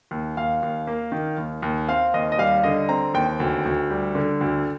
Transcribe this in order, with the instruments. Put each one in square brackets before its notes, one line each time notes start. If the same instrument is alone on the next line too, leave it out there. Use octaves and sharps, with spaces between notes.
[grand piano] D#2
D#2 F5
D#2
A#3
D#3
D#2
D#2
C4 F5
D#2 D#5
D#5
G3 F5
D3 D#5
C4 A#5
D#2 G5
D2
D2
G3
D3
D2